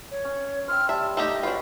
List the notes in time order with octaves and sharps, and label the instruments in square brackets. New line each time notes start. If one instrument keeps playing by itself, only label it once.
[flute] C#5
[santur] C#4
[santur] C5 E5 G5 [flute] F6
[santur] G3 [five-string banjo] E5 [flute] A5
[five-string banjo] A3 D#4 G4 [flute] D#5
[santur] C#4 F#4 B4 [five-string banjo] D4 F4